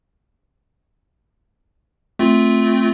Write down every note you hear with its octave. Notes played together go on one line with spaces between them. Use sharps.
A3 C4 F4